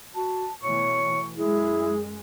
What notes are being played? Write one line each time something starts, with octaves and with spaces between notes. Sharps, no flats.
F#4 A5
B2 E3 A3 C#5 C#6
F#2 G#3 E4 G#4